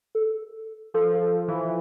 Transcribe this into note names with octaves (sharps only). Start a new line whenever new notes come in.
A4
F3 A4
A4
E3